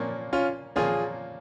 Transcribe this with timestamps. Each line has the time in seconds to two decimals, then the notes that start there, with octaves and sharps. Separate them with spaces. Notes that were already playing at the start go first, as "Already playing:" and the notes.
Already playing: A#2 F3 A#3 C#4
0.33 C#4 F4
0.76 A#2 F3 A#3 C#4 F4 G#4